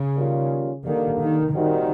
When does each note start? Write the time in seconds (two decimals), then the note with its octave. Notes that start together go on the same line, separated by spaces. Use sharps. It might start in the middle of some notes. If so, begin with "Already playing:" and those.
Already playing: C#3
0.16 D#3 G3 A#3 C#4 F4
0.85 D3 D#3 G3 A#3
1.19 D#3
1.53 A#2 D#3 G3 C4 D#4 F#4